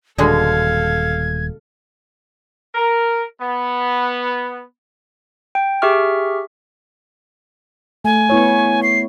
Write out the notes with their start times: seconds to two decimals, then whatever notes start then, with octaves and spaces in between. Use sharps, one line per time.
0.18 D#1 B2 D3 G#3 A4 F5 G#6
2.75 A#4
3.41 B3
5.55 G5
5.82 G4 G#4 E5 C#6 F6
8.05 A3 G#5
8.30 B3 E4 C#5
8.83 C7